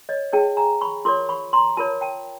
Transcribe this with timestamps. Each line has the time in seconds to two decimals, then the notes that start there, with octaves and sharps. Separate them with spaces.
0.09 C#5 D#5
0.33 E4 G#4 C#5 G5 A5
0.57 G#5 A#5
0.81 B5 C#6
1.05 F4 A#4 C#5 C6 D6
1.29 B5 C#6
1.53 A#5 C6
1.77 F4 A#4 C#5 A5 B5
2.01 G5 A5